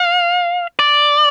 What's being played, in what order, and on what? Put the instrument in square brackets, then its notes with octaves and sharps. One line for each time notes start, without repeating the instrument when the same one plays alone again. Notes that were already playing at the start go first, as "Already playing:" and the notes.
Already playing: [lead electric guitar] F5
D5